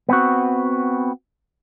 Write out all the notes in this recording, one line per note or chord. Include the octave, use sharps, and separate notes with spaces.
B3 C4 F#4